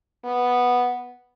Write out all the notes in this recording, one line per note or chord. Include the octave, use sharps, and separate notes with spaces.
B3